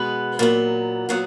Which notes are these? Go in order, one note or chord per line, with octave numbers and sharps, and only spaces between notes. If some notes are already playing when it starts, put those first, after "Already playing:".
Already playing: B2 G#3 B3 B4
A#2 F#3 B3
A#2 F#3 B3